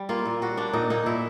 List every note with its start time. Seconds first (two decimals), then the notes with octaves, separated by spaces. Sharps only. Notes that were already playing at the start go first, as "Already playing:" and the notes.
Already playing: G3
0.09 A#3 F4
0.25 A#2
0.42 G3 F#4
0.57 A#3 D4
0.73 A#2 D#4
0.90 A#3 D#4
1.06 A#2 E4